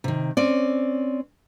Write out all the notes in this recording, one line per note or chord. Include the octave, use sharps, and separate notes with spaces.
C3 D#3
C4 C#4 D5